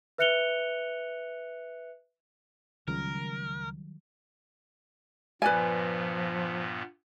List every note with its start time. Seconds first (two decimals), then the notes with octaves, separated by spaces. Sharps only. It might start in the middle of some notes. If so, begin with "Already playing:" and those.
0.18 B4 E5 F#6 C#7 F7 G7
2.88 C#2 D#3 F#3 G3 A#4
5.42 G2 A#2 F3 B3 B4 D5 G#5